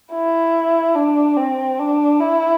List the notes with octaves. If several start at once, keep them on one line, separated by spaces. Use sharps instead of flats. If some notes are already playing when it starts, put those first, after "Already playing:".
E4
D4
C4
D4
E4